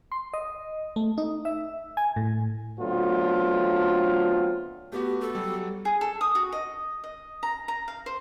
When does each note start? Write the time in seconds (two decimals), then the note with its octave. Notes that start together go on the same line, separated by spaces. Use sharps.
0.12 C6
0.34 D#5
0.96 A3
1.18 D#4
1.45 E5
1.97 G#5
2.16 A2
2.80 D3 F#3 A3 B3 C4 F4
4.92 A3 B3 F#4 G4
5.21 A4
5.35 F#3 G3
5.85 G#4
6.01 A4
6.21 D#6
6.35 F#4
6.52 D#5
7.04 D#5
7.43 A#5
7.68 A#5
7.88 F5
8.06 C5